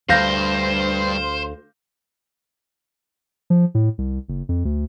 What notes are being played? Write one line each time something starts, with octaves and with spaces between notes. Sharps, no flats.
D2 G2 C5 F5 G6 A#6
F3
A2
C2
F#1
F2
D2